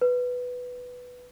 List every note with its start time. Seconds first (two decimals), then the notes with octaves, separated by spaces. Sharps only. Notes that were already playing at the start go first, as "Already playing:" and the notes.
0.01 B4